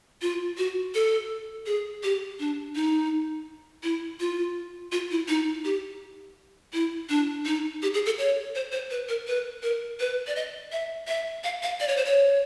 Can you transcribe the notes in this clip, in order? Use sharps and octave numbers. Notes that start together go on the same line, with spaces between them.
F4
F#4
A4
G#4
G4
D4
D#4
E4
F4
F4
E4
D#4
G4
E4
D4
D#4
G4
G#4
A4
C#5
C5
C5
B4
A#4
B4
A#4
B4
D5
D#5
E5
E5
F5
F5
D5
C#5
C5
C#5